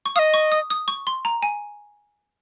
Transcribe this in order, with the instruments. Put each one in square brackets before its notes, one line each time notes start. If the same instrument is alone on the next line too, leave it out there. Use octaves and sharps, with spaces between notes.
[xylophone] C#6
[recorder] F5 [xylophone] D#6
[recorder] D#5
[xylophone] C#6
D#6
D#6
C#6
C6
A#5
G#5